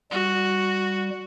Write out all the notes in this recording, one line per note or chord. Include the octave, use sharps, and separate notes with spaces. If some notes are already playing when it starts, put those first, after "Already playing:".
G3 F#4